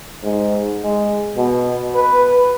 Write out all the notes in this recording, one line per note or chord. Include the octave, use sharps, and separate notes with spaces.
G#2
G#3
B2
B4